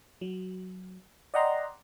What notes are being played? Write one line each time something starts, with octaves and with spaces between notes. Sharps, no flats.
F#3
D5 D#5 F#5 G5 A#5 C6